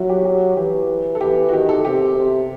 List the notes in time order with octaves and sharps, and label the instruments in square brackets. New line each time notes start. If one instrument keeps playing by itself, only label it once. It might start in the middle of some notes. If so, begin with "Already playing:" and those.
Already playing: [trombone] F#3 [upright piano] E4 F#4
[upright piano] G4
G4
[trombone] E3 [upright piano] G4
[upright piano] A4
[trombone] E3 [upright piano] G4
[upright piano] F#4
[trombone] D#3 [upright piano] G4
[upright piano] A4
[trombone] C3 [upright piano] G4
[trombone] C3